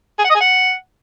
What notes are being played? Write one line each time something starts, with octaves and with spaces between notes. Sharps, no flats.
G#4
F#5
D#5
G#4
F#5